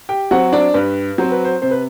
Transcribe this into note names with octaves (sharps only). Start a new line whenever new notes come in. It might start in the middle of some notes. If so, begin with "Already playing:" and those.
G4 G5
F#3 C4 F#4 F#5
D4 D5
G2 B4
F#3 C4 C5
B4
C5
C3 C5
B4